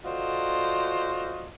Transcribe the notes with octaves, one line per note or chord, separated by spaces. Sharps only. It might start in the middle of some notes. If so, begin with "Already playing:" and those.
F4 F#4 A4 C5 D5 D#5